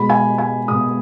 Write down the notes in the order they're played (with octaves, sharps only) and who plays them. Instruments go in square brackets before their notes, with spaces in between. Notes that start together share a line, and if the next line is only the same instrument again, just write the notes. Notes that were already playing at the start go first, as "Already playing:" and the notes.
Already playing: [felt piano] B2 G#3 B5
G#5
G#5
B2 G#3 D#6